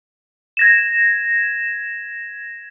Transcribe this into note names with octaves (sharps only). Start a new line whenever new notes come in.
G#6 A#6 E7